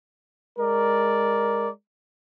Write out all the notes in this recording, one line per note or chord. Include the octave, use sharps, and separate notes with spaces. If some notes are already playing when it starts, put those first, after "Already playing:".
G#3 A#4 D5